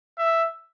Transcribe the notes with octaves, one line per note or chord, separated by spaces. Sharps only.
E5